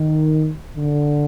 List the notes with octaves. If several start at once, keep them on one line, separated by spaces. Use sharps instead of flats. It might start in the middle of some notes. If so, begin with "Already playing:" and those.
Already playing: D#3
D3